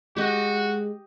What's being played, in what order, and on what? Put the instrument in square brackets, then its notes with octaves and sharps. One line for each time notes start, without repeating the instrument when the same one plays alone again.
[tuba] G#3 [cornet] F#4 [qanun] G4 D#5